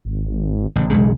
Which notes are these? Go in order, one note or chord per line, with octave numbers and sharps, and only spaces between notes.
G#1
A1 C#3
E1 B1 C#3 G#3